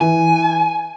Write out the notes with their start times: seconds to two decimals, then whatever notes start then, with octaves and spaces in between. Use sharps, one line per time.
0.01 E3 G#5